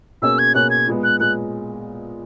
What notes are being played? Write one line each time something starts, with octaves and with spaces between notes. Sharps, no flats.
B2 A#3 C#4 G#4 C#5 E6
G#6
B2 A#3 C#4 G#4 C#5 F#6
G#6
A#2 G#3 B3
F#6
A#2 G#3 B3 F#6